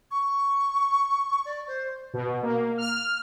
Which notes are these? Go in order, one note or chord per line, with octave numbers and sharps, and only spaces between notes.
C#6
D5
C5
B2
A#3
F6